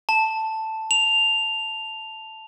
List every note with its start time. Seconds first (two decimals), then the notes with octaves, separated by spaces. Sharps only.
0.09 A5
0.91 F7